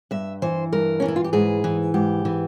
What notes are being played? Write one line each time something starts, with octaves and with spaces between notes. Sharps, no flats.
G2 E5
E3 C5
G2 A#4
E3 C#4
E4
F4
G4
G#2 G#4
E3
G#2 G4
E3